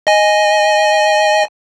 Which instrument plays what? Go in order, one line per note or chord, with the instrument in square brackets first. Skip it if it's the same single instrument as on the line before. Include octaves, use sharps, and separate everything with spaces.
[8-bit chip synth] D#5 G#5